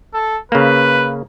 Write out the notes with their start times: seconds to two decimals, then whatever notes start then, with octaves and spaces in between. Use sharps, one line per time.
0.14 A4
0.52 C#3 A#3 B4